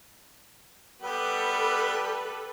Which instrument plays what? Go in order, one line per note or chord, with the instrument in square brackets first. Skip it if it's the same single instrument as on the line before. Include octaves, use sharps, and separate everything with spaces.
[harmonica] G3 B3 G4 [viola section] A4 B4